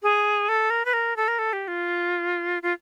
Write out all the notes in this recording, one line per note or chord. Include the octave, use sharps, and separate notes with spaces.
G#4
A4
A#4
B4
A#4
A4
A#4
A4
G4
F4
F4